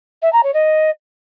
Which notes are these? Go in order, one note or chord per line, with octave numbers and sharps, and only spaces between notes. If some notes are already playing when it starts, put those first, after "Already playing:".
E5
A#5
C#5
D#5